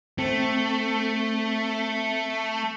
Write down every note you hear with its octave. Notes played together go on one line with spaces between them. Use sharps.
A3 C4